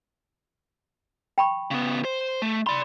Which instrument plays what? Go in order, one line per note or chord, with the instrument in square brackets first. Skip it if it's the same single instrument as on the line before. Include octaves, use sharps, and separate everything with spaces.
[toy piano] G5 B5 C#6
[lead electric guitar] C#3 B3
C5
A3
[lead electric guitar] D5 C6 [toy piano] B5